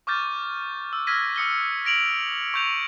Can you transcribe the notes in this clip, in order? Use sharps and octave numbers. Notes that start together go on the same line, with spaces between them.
C#6 D6 F6 G6 A6
E6
E6 F6 G#6 A#6 B6 D#7
D#6 C#7 G7
A#6 D7 F7 F#7
C#6 G6 F7